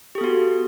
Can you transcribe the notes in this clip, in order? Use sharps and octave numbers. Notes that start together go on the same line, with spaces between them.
B3 F#4 G4 A4